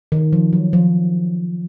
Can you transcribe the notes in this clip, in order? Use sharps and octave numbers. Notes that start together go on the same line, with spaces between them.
D#3
F3
F#3
F3